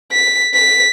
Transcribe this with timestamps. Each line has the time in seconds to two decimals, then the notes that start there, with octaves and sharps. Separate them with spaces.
0.12 B6
0.54 B6